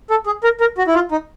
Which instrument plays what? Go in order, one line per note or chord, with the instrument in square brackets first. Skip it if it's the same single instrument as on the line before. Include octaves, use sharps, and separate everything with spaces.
[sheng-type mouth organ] A4
G#4
A#4
A#4
F#4
E4
F4
D#4